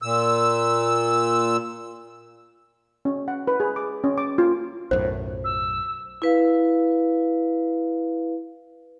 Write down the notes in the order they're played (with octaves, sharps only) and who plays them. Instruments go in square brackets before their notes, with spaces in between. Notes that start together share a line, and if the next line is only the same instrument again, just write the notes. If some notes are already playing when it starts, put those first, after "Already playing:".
[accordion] A#2 E6
[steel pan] C#4
F#5
B4
G#4
D6
C#4
D6
F4
[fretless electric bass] B1 F#2 A2 [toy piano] C5
[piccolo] E6
[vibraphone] E4 B4 F5